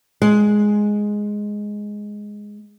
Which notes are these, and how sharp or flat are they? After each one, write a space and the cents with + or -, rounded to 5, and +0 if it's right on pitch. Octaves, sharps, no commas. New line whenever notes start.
G#3 +0